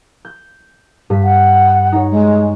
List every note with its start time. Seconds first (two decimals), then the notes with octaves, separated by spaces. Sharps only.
0.25 G6
1.10 G2 B6
1.24 F#5
1.92 D#4 C#5
2.11 G#3